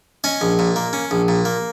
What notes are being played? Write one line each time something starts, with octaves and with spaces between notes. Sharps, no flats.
C#4 D#5 G#5
A#1
A#2
A#3
C#4
A#1
A#2
A#3